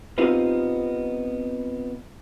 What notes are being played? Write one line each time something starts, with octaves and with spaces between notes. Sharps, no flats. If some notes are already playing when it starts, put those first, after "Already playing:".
B3 C4 D#4 F4 G4